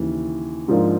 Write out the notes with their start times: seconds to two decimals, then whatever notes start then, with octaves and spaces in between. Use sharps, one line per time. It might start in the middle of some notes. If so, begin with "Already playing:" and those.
Already playing: D#2 C#3 E3
0.68 G#2 F3 A#3 D4 F4